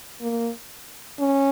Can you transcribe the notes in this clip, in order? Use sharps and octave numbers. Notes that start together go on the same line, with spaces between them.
A#3
C#4